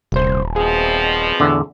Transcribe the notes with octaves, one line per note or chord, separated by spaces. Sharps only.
D#1 C2 C5
B2 F3 C4 G#4
E2 A2 D3